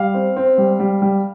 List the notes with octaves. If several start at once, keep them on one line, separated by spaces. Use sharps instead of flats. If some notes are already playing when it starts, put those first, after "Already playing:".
Already playing: G3 F5
C4
C4
G3
G3
G3